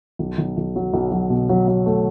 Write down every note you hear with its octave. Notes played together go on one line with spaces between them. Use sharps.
B1
B1
B1
F#3
B1
F#3
B2
F#3
F#3
A3